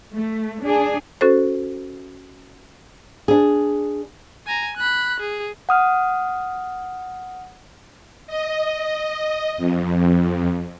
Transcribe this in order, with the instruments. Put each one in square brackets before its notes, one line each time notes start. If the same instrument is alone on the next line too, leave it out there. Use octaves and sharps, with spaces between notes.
[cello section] A3
D4 G#4
[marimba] C#4 F#4 A4 C5
[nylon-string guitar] D4 G#4
[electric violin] G#5 A#5
B5 F#6
G#4
[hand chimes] F#5 D#6 F6
[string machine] D#5
F2